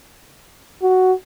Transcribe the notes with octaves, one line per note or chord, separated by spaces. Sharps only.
F#4